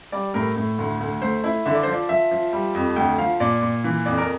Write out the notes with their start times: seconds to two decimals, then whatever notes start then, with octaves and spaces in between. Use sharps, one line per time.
0.12 G3 D5
0.34 A2 A#4
0.56 A2
0.79 D2
1.00 D2
1.21 A3 C5
1.44 E4
1.66 D3 E5
1.74 D5
1.83 C5
1.87 F3
1.93 D5
2.09 F3 E5
2.31 F3
2.53 G3
2.75 F2
2.96 D2 G5
3.18 F3 F5
3.40 A#2 D5
3.61 A#2
3.84 E3
4.06 F2 D5
4.18 A#4